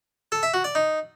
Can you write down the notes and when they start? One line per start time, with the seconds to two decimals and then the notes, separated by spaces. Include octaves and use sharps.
0.32 A4
0.43 E5
0.54 F#4
0.64 D5
0.75 D#4